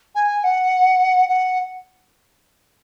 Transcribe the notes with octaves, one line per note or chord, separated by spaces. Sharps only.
G#5
F#5
F#5